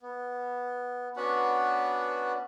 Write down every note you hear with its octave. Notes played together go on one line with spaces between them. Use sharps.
B3
B3 C#4 D4 F#4 B4 F#5